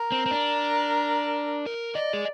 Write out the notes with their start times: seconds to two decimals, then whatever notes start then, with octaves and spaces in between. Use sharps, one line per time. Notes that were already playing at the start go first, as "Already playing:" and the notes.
Already playing: A#4
0.12 C4
0.26 C4
0.31 D4
1.66 A#4
1.95 D5 D#5
2.13 G#4